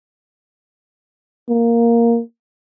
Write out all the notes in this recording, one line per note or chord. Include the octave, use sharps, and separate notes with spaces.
A#3